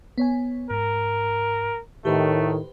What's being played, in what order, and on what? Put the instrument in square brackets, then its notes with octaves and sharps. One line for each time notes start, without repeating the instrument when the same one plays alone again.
[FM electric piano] B3 C#5 G#5
[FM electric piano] G#2 [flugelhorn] A#4
[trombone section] A2 D#3 [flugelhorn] A3 [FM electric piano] G4 B4 C5